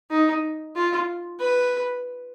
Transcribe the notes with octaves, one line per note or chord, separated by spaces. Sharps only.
D#4
F4
B4